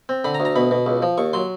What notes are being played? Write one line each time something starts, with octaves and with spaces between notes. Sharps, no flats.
C4
D3 B5
A#5
D2
A#5
B2 B5
B2
C#2
F3
D#2 C#6
F#3 C6